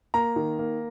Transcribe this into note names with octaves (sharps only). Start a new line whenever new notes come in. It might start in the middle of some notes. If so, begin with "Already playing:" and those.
A#3 A#5
D#3
A#3